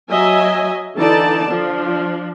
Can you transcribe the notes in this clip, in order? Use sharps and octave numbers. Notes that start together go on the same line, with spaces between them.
F#3 D#5 E5 G#5
D3 E3 D#4 D5 A5
F3 D4